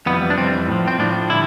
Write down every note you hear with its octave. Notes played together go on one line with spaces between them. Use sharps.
F2 E3 G3 B3
D4
F2 E3 G3 C4
A2 F3
C4
A2 F3 D4
D3 G3 E4